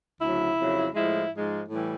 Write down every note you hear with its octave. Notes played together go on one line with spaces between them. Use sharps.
D2 C#3 F#3 E4
F2 C#3 F#3
A2 F3 G#3 E4
G#2 F3 G#3
A2 E3 G3